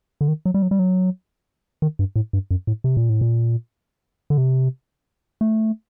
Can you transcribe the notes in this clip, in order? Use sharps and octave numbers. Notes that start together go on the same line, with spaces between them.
D3
D#3
F#3
G3
F#3
G3
F#3
D#3
G2
A2
G2
F#2
A2
C3
A#2
A2
A#2
D3
C3
A3